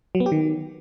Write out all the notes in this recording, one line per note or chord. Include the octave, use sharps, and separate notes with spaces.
F#3
B3
G4
D#3